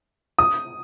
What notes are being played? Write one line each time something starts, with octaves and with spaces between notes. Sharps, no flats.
D#6